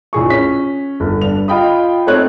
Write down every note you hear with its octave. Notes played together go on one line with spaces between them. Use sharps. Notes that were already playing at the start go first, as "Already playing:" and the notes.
A#1 A2 G#4 C#6
C#4 B6
G1
G2 F7
F4 D#5 G5 B5 D#6
A3 C4 D#4 C#5 F#6